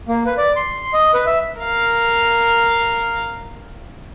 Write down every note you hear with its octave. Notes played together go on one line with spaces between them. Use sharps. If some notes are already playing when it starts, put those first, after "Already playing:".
A#3
B4
D5
C6
D#5
B4
E5
A#4 F5